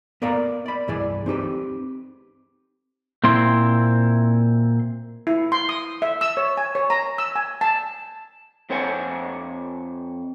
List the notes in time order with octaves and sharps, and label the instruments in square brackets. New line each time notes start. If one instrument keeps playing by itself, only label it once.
[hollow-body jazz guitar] B3 A#4 D5 F5 A#5
D5 B5
C2 G2 E3 G#4 D5
C4 D#4 G4 B4
[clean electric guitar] A#2 C4 E4 C6
[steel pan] E4
C6
D#6
E5
E6
C#5
G#5
C#5
A#5
E6
G#5
A5
[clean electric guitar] F2 C4 C5 C#5 F#5 G#5